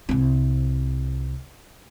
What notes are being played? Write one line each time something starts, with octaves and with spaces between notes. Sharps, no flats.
C2 C4